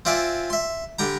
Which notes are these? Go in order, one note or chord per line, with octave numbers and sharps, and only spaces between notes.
C4 F4 D5 E5 G#5
E5 C6
D3 G3 G5 A#5